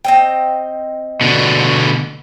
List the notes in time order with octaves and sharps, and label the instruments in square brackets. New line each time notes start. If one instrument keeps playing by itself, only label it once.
[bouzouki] C4 D#5 G5
[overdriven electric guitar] B2 D3